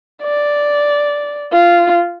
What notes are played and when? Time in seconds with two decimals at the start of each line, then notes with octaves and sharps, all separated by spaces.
0.23 D5
1.52 F4